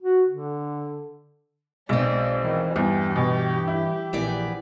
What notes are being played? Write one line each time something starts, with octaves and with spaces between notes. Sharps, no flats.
F#4
D3
B1 G#3 C4 D5
D#3 E3
E2 G2 E3 G4
B2
E4
A#1 E3 B3 D5